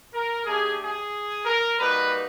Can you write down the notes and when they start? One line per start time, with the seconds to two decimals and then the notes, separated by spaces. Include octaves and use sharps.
0.13 A#4
0.46 A3 D4 G4 G#4
0.79 G#4
1.46 A#4
1.79 G3 A#3 D#4 F#4 B4